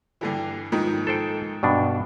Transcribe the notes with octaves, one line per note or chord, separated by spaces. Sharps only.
G2 D3 E3
G#2 D#3 F3
A4 C5 G5
G2 B2 D4